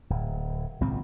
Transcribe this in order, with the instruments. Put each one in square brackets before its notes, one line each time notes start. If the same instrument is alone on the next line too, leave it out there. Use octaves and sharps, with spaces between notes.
[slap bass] D1
G#1 C#2 A#2 C4